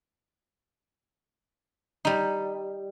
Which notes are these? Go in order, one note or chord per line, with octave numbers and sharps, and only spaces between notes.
G3 D#4